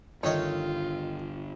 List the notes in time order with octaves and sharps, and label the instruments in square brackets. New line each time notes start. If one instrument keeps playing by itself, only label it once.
[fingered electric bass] G2 D3 [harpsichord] D#3 C#5 D#5 [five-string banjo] A3 D#4 [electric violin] F4